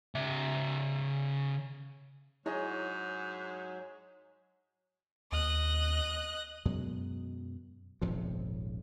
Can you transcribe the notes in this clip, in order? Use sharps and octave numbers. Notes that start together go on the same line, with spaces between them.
C#3 E5
G#2 F#3 E4 G#4 C#5 D#5
D#2 D#5 F#6
F#2 B2 F#3 G#3
D#1 G#1 C3 F3